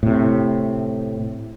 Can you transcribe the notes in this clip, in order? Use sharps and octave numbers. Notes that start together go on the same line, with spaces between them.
A2 C3